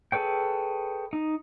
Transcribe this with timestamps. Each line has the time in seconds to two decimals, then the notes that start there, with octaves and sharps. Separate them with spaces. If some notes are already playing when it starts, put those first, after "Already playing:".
0.12 G#4 A4 B4 C#5 G5
1.13 D#4